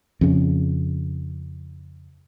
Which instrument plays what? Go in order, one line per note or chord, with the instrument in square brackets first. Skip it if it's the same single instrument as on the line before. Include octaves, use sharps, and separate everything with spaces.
[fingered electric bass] F2 C#3